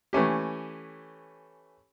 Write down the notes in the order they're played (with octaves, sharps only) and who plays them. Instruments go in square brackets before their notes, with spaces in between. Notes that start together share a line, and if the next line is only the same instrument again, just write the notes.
[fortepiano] E3 A3 C#4 G4